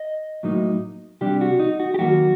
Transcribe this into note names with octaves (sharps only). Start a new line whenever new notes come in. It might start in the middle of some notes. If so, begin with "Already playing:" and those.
Already playing: D#5
A2 F#3 A#3 D#4
C3 G3 D4 G4
F#4
D#4
F#4
G4
D#2 D#3 F#3 A#3 F#4